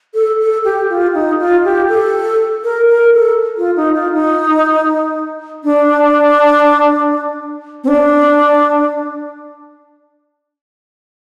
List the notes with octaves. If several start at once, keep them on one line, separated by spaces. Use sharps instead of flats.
A4
A4
G4
F4
D#4
F4
G4
A4
A#4
A#4
A4
F4
D#4
F4
D#4
D4
C4
D4